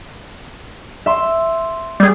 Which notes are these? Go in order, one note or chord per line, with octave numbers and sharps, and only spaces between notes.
E5 C6
G3 G#4